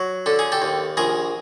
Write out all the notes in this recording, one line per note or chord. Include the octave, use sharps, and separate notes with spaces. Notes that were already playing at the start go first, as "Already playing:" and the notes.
Already playing: F#3
D3 A4
G#4
G4 A4
D#2
A#1 G#4 A#4